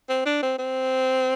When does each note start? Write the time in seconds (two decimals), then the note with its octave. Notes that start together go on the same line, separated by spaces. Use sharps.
0.09 C4
0.26 D4
0.42 C4
0.58 C4